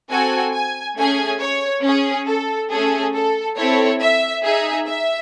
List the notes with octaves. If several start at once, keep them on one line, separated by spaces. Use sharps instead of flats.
C4 F#4 A4 G#5
G#5
A3 C#4 G#4 G#5
C#5
C#4 G#4
A4
A3 C#4 G#4 A4
A4
C4 E4 A4 C#5
E5
D#4 G#4 E5
E5